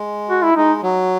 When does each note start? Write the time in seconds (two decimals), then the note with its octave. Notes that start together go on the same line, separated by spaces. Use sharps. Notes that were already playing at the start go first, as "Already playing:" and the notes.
Already playing: G#3
0.29 F#4
0.42 E4
0.56 G#3 D#4
0.83 F#3